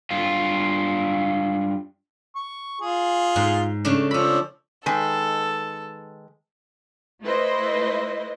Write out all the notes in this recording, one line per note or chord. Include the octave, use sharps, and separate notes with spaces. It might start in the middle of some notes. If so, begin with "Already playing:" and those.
G2 F4
C#6
F4 G#4
G#2
C#3 A3 D4
F3 C#4 D5 B5 E6
D#3 G#3 A4 B4
A3 E4 B4 C5 D#5